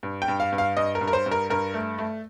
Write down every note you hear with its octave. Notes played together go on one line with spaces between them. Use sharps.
G2
G5
G2
F5
G2
F5
G2 D#5
A#4
G2
A#4
C5
G2
A#4
G2 A#4
A3
A3